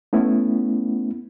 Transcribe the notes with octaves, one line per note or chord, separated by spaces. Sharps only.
A3 B3 C#4 E4